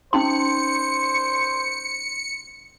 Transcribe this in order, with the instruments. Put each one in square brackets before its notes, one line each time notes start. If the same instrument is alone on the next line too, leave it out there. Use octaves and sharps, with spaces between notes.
[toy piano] C#4 D#4 C6 [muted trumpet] C5 [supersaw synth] C#7